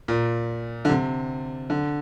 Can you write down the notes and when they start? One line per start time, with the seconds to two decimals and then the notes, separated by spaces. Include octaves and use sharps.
0.08 A#2
0.85 D3
0.89 C3
1.70 D3